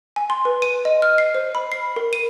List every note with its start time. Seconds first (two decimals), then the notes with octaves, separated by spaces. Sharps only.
0.16 G#5
0.30 C6
0.45 B4
0.62 D#7
0.85 D#5
1.02 F6
1.18 C7
1.35 C5
1.55 B5
1.72 C7
1.96 A#4
2.13 D#7